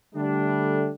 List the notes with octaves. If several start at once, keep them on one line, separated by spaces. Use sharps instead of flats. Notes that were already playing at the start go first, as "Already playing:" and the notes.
D3 G3 A3 D4